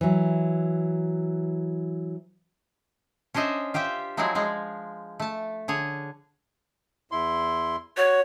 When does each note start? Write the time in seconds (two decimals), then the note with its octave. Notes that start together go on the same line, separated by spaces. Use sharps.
0.01 E3 F#3
3.34 C#4 D4 C5 D#5 E5
3.74 F4 G4 C5 E5 G5
4.17 F3 F#3 G#3 A3 E4 G#4
4.35 F3 G#3 F5
5.20 A3 A5
5.68 D3 G#4 C#5
7.12 E2 E4 C6
7.97 F#4 C#5